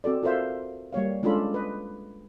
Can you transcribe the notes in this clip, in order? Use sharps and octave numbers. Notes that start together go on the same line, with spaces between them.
C4 F#4 A4 D5
F4 A4 A#4 C5 E5 F5
G3 A#3 C#5 F5
G#3 C#4 D4 F4 A4 B5
B4 D#5